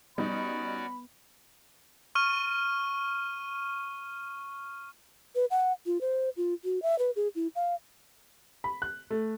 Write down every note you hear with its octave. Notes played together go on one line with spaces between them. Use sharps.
G3 B3 C#4 D#4 F#4 D5 B5
C#6 F6 D#7
B4
F#5
F4
C5
F4
F#4
E5
B4
G#4
E4
F5
B5
F#6
A3